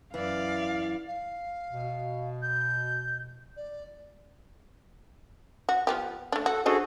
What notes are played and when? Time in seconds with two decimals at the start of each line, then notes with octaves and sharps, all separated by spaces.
0.14 F#2 E3 D5 F5
1.07 F5
1.72 B2
2.42 G6
3.56 D5
5.69 F#4
5.87 F3 B3 G4
6.32 A3 D4
6.46 F#4 A4
6.66 D4 F#4 G#4 A4 C5 D#5